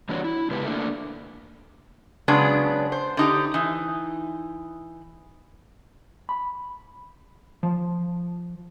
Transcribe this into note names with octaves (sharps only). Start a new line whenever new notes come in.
E3 G3 A#3 D4 F#4 C#5
E4
C#3 G#3 B3 G4 B4
A3 A#3 D4
C#3 F#3 G#3 B3 C#4 D4
C5
D3 D#4 G4
E3 D#4
B5
F3